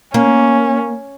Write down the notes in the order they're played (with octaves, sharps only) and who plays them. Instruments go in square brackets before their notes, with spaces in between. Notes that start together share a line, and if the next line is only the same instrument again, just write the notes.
[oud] A#3 [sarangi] C#4